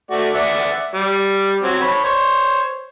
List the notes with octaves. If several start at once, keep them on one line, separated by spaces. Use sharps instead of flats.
A3 F#4 D5
D5 E5 F#5
G3
F#3 C4
C#5 B5
C5 C#5